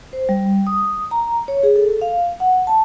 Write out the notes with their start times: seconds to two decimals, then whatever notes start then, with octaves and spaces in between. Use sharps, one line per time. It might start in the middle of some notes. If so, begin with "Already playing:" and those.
0.13 C5
0.29 G3
0.67 D#6
1.11 A#5
1.48 C#5
1.63 G#4
1.76 A4
2.02 F5
2.40 F#5
2.67 A5